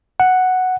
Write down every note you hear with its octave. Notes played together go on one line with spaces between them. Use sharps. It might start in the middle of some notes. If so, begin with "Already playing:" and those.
F#5